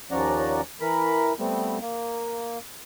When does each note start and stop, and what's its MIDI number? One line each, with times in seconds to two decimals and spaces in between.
0.11 0.61 39
0.11 0.61 53
0.11 0.61 61
0.11 0.61 74
0.11 0.61 78
0.11 0.61 82
0.81 1.33 52
0.81 1.33 70
0.81 1.33 83
1.39 1.78 55
1.39 1.78 57
1.39 1.78 59
1.39 1.78 60
1.81 2.58 58